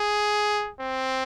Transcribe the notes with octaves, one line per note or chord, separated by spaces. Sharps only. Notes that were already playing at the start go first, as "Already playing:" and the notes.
Already playing: G#4
C4